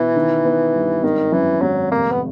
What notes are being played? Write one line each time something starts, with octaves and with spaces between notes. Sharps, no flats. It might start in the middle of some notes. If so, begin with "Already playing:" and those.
Already playing: B2 E3
D#3
B3
G2
G#1 D#3
F#2 E3
G#1 F#3
F1 A#3
B3